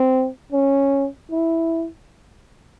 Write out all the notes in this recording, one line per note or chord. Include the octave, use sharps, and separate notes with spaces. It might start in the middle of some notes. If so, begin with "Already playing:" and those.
Already playing: C4
C#4
E4